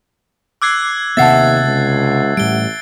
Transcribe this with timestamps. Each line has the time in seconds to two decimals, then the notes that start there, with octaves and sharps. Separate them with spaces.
0.62 D6 E6 F#6 G#6 C7
1.17 D#2 C3 B3 E5 F#5 A5 A6 C7
1.64 C#2
2.37 A1 A2 G3 D7 G7